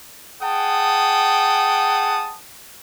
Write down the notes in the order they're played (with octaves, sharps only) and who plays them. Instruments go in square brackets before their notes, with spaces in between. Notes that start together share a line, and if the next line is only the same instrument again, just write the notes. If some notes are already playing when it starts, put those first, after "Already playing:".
[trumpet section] G#4 F#5 G5 A5 D#6